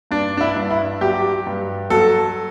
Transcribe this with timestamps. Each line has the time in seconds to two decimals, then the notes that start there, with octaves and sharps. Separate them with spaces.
0.11 G2 D4
0.37 D4
0.41 E4
0.56 G2
0.71 E4
1.01 F#3 G4
1.47 G2
1.90 F#3 A4